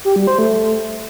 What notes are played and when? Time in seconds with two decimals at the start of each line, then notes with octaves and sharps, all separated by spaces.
0.05 G4
0.16 G3
0.27 C5
0.39 A3